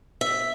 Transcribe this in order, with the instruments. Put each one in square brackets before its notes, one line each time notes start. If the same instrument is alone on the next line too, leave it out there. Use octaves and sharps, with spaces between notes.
[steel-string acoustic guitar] E5